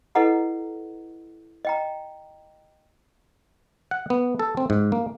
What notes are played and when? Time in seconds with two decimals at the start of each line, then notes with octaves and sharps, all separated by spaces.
0.15 E4 A4 B4 D#5 F#5 A#5
1.65 D#5 G5 A#5
3.91 F#5
4.10 B3
4.39 A4
4.57 C4
4.70 G#2
4.92 A#3